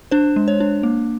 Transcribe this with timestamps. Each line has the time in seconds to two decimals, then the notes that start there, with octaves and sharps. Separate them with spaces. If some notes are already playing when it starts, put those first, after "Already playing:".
0.11 D4 C5
0.36 G#3
0.48 C#5
0.60 D4
0.83 A#3